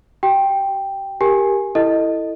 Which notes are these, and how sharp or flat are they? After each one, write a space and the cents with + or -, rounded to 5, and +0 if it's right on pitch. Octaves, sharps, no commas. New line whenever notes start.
G4 -45 G5 +0
G4 +0 A#4 +0 G#5 +0
E4 +0 A4 +15 D#5 +0